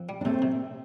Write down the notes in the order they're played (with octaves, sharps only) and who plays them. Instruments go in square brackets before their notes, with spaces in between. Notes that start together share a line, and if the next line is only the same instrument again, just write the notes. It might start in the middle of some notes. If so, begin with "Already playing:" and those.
Already playing: [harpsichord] F2
G3
[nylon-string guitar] D4
[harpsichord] C3 [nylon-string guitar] A3 C4
[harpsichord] C3